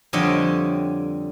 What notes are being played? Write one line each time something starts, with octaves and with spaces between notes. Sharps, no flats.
F2 D3 G3 C#5 D#5